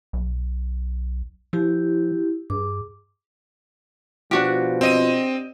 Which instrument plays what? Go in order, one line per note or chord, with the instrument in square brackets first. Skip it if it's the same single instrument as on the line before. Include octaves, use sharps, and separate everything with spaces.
[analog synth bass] B1
[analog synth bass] F3 [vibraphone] E4 G4
[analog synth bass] G2 [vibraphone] G#4 D6
[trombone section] B2 F3 [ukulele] D4 F#4 G4
[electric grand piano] C4 D#5 D#7